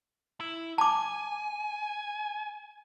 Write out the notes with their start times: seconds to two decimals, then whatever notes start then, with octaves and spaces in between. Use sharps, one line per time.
0.40 E4
0.78 G#5 A5 D6